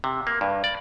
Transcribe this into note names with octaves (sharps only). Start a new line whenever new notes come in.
C3
A#3
G2
D5